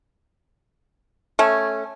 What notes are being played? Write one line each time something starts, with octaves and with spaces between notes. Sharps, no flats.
A3 C#4